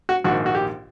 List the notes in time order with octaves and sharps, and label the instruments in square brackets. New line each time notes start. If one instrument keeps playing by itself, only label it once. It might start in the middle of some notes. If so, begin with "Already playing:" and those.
[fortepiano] F#4
A#1 G#2 D#3 F#4
F#4
G4